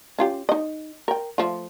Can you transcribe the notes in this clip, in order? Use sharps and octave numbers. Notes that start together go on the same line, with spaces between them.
C#4 F4 G4
D#4 D#5
A#4 G5
F3 A3 F4